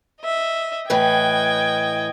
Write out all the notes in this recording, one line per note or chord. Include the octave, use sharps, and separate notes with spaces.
D#5 E5
A2 E3 B4 D#5 G5 G#6